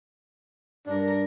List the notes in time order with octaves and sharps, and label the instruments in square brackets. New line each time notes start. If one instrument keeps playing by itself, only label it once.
[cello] G2 A#4 [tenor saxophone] D4